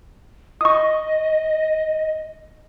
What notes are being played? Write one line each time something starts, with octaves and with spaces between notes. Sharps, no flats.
D#5 C#6 D#6